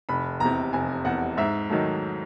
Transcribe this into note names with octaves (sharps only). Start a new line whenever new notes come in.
F1 B5
E2 C3 A#5
F1 G#5
E2 C3 F#5
G#2 E5
D#3 F#3 A3